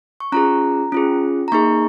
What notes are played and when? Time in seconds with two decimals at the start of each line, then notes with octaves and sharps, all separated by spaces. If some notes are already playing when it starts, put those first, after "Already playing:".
0.20 C#6
0.32 C#4 F4 G#4 A#5
0.92 C#4 F4 G#4
1.48 A#5
1.52 A#3 D#4 G#4 C#6